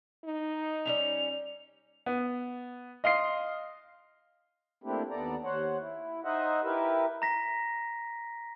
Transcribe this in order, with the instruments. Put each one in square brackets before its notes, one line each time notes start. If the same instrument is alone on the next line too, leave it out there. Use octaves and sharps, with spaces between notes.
[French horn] D#4
[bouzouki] G3 G#3 C#4 [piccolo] F7
[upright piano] B3
D#5 F5 C6 C7
[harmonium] A3 A#3 C4 D4 E4 G4
D#2 B3 A4 D5 A#5
D#2 C5 C#5 F#5
E4
D#4 C5 D#5 E5 F#5
E4 G4 A#4 B4 E5
[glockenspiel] A#5 A#6 B6